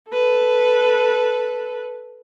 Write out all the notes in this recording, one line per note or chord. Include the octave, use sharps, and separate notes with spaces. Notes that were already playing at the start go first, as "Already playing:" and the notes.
A4 B4